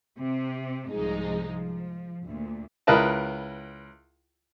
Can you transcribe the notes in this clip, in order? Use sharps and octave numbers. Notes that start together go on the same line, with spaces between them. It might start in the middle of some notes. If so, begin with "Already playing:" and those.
C3
C2 G#2 F3 G#3 D#4
F3
D2 A#2
C#2 E4 A#4 B4 D#5 A5